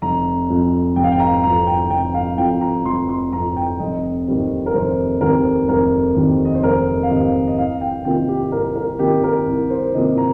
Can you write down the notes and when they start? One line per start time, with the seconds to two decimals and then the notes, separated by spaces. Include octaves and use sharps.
0.02 F1 A#5
0.49 F2 F3
0.96 F1 G5
1.04 F5
1.12 G5
1.19 A#5
1.43 F2 F3 A#5
1.67 G5
1.90 F1 G5
2.14 F5
2.38 F2 F3 G5
2.61 A#5
2.85 F1 C6
3.09 C6
3.33 F2 F3 A#5
3.56 G5
3.80 F1 D#5
4.27 D#2 D#3 G3 C4
4.66 A#4
4.74 F1 C5
5.21 D#2 D#3 G3 C4 A#4
5.69 F1 A#4
6.16 D#2 D#3 G3 C4
6.45 D#5
6.55 C5
6.63 F1 A#4
7.03 F5
7.10 D#2 D#3 G3 C4 D#5
7.48 D#5
7.58 C2 F5
7.81 G5
8.05 C3 D#3 A#3 F4 G5
8.28 G4
8.52 C2 A#4
8.76 A#4
8.99 C3 D#3 A#3 F4 G4
9.24 A#4
9.47 C2
9.70 C5
9.94 C3 D#3 A#3 F4 D#5
10.18 A#5